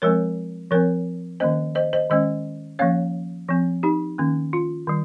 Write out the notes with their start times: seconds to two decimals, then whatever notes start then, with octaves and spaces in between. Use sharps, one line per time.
0.02 F3 G#3 C4 A#4 C#5
0.71 F3 C4 A#4 C#5
1.40 D#3 A#3 C#4 C5 D#5
1.75 C5 D#5
1.93 C5 D#5
2.10 D#3 G#3 C#4 C5 D#5
2.79 F3 A#3 C#4 C#5 F5
3.48 F3 C4
3.83 D#4 G4
4.18 D#3 A#3 C#4
4.53 F4
4.87 D#3 G3